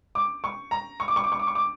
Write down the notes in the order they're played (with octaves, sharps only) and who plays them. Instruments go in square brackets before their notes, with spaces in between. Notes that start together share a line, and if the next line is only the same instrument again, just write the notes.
[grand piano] D6
C#6
A#5
C#6
D6
C#6
D6
C#6
D6
C#6
D6